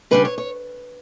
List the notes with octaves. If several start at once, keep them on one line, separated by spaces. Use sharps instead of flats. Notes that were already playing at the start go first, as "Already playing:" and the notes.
C#3 G3 D4 B4
C#5
C#5